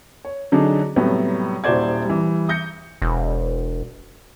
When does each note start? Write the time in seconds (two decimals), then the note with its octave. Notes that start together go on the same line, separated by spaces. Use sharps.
0.25 C#5
0.52 D3 F#3 D4 D#4 G#4
0.96 A2 C3 F#3 G3 B3
1.64 D#1 E4 F#4 C5 D5 G#6
2.05 E3 G3
2.49 D#6 G6 A#6 C#7
3.02 E1